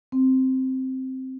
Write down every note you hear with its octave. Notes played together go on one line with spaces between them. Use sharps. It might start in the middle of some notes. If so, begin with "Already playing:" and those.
C4